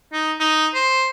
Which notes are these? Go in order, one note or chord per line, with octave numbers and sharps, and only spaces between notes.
D#4
D#4
C5